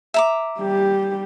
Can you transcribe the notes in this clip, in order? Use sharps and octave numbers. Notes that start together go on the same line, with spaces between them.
E5 A#5 D6
G3 G4